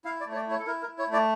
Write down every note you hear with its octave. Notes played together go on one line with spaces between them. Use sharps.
E4 F5
D5
A3
C#5
D5
E4 C#5
A4
E4 A#4
A#4
E4
C#5
A3
D5